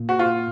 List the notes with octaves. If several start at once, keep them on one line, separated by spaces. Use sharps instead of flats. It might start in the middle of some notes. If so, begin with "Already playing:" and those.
Already playing: A#2
F#4
F4